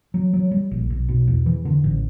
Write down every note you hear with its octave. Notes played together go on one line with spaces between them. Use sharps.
F#3
F#3
G3
A#1
B1
B2
E2
E3
D3
A1